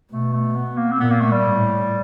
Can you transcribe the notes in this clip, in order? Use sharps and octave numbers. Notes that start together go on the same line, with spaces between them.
B2 A3
A3
B3
A#3
C4
A#2 B3
A#3
A3
G3
A2